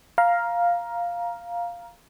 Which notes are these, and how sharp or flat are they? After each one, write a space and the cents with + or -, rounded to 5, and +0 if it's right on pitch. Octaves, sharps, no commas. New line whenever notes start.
F5 +0 A#5 +15